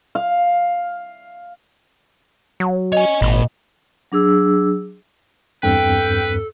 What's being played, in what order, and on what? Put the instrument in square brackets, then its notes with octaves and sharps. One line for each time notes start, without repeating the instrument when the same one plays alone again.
[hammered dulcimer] F5
[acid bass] F#3
[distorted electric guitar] C#5 G#5 [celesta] D#5
[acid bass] G#1 [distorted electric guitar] A#2 B5
[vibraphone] F#3 D4 G#4 E6
[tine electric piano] E2 G2 C4 [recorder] A4 [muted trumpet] B4 [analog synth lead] G5